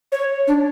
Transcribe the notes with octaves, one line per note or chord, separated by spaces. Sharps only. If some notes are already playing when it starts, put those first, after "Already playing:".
C#5
D4